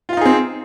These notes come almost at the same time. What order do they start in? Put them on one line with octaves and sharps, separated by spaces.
F4 F5 D#4 G#4 C4